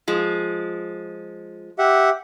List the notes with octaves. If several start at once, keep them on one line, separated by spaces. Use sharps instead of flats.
F3 G#3
G4 E5 F#5